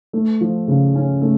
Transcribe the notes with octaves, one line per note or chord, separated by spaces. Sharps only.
A3
F3
C#3
C#4
A3